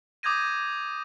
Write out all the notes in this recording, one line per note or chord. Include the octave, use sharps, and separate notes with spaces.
D6 D#6 G6 G#6 A#6 D#7